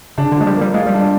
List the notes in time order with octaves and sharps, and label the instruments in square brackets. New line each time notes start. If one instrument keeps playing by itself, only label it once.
[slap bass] C#3 [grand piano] D4
[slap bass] D3
[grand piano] F3 [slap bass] G#3
[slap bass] G3
[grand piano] A#3
[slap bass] G3
[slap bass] G#3 [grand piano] F4
[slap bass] G3
[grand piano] D4